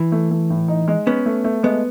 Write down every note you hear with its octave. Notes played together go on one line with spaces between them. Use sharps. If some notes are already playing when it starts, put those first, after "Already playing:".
Already playing: E3
A3
A3
A2
D#4
G#3
B3 C#4
A3
A3
G#3 B3